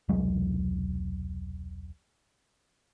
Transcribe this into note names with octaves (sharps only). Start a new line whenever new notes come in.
E1 C2 F#3 G#3